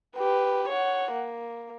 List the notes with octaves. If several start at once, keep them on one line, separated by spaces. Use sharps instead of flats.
G4 B4
C#5 F#5
A#3